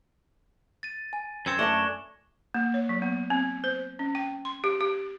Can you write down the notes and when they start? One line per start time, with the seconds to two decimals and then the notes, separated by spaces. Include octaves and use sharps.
0.83 A6 D#7
1.13 G#5
1.46 F#2 C4 G#6 C#7 E7
1.59 F#2 A3 D4 D5 C#6 A#6 E7 G7
2.54 A#3
2.74 C#5
2.89 F#3
3.02 B3
3.30 C4
3.64 C5
3.99 C#4
4.15 G5
4.45 C6
4.64 G4
4.81 G4